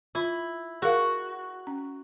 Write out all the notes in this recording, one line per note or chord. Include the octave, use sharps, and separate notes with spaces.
E4 F4
F#4 G#4 A#4 F5
C#4